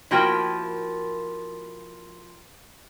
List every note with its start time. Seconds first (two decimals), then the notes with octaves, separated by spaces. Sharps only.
0.11 F3 A#3 E4 F#4 A#4 G5